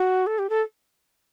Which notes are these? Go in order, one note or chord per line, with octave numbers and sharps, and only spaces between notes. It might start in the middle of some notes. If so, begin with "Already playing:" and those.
Already playing: F#4
A4
G4
A4